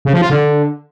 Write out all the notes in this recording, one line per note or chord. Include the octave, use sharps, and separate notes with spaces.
C#3
F3
F4
D3